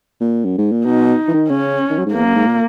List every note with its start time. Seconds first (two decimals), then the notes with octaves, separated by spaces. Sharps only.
0.20 A#2
0.45 F#2
0.58 G#2
0.72 A#2
0.86 B2 D#4
1.28 E3
1.34 D#3
1.49 C#3 C#4
1.90 D#3
1.98 F#3
2.06 G#2
2.14 E2 A#3
2.25 F#2
2.35 G#2
2.47 A#2